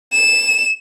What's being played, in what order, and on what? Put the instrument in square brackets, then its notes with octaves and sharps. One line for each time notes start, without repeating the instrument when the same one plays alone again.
[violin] E7